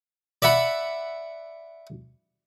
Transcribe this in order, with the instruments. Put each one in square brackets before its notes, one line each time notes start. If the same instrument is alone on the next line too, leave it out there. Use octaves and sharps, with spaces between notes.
[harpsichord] D5 E5 F#5 B5